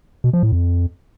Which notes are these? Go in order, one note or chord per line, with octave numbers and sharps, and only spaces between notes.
B2
F3
A2
F2